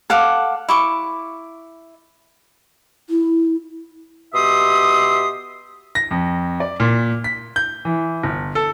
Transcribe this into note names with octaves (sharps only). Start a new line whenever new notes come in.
A4 F5 F#5 D6
E4 C#6 D6
E4
B2 G4 E5 C6 D#6
A#6
F2
D5
A#2
B6
G6
E3
G1
A4